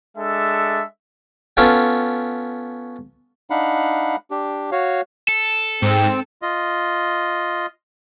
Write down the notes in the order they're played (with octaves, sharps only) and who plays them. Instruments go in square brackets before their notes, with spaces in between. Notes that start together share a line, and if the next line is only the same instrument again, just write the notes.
[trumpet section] G#3 D4 A4 E5
[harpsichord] B3 C#4 F4 A4 C#5 G5
[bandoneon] D4 D#4 F5 F#5 B5
D4 G4
F#4 C#5 F5
[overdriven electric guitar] A4
[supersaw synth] G#2 [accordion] C4
[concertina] F4 D#5